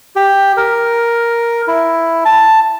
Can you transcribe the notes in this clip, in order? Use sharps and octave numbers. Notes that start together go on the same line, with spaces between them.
G4
A#4
E4
A5